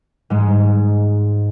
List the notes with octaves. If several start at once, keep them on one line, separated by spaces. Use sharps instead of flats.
G#2 G#3